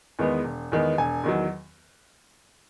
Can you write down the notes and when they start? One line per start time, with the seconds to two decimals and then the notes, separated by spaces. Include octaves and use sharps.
0.19 E2 D#3 G#3 B3
0.44 E1
0.72 E2 D#3 G#3 B3
0.98 E1 G#5
1.24 E2 D#3 F#3